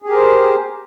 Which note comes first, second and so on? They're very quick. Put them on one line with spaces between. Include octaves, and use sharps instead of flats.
G#4 G4 A#4 C5